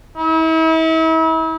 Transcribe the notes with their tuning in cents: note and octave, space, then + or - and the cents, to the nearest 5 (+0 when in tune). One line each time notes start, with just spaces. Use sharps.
E4 -40